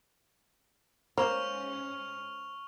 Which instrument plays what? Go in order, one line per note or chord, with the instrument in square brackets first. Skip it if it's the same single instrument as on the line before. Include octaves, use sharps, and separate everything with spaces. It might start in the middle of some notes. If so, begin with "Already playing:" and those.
[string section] G#2 C#4 [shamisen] A#3 [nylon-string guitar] C5 [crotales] C#6 F6 F7